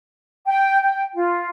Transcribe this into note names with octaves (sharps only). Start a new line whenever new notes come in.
G5
G5
F4